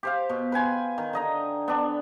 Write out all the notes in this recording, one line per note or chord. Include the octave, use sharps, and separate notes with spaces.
G4 C5 F5
B2
B4 G5 G#5 C6
D#3
D3 D#5 A#5
B3 D4